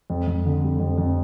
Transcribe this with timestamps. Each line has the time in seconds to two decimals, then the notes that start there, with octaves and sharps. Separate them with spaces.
0.10 F2
0.27 F2
0.45 D3
0.63 G3
0.80 F2
0.98 F2